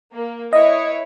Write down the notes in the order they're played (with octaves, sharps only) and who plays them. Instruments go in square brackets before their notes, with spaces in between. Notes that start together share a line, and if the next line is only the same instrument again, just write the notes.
[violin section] A#3
[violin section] E4 B4 C#5 [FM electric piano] D#5